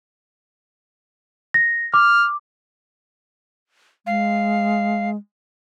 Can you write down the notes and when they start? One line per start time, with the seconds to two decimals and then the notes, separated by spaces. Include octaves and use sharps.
1.54 A#6
1.94 D6 F6
4.06 G#3 F5